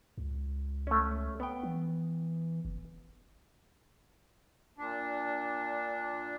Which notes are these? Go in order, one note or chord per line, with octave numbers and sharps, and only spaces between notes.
C#2
A3 C#4
B3 G5
E3
F#1
A#2 D4